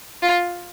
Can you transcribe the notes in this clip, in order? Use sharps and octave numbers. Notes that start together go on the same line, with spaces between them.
F4